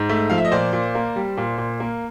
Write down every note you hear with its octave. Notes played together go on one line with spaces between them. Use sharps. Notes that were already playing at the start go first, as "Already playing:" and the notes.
Already playing: G#2
A3
F3 F5
E5
D#5
A#2 C5 D5
A#2
A#3
G3
A#2
A#2
A#3